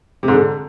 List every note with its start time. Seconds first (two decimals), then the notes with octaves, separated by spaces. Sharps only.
0.23 C3
0.28 G#2
0.33 D3